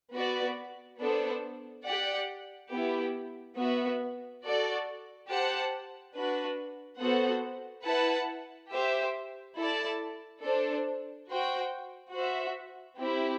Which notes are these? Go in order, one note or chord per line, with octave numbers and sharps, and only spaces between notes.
B3 F#4 B4 D5
B3 D4 A4 C5
G4 D5 F#5
B3 E4 G4
B3 F#4 B4 E5
F#4 A4 D5
G4 C5 F#5 A5
D4 F#4 B4
B3 F#4 A4 C5 F#5
E4 B4 F#5 A5
G4 C5 E5
E4 A4 D5 A5
D4 A4 C5
F#4 C5 G5
F#4 C5 E5
C4 E4 G4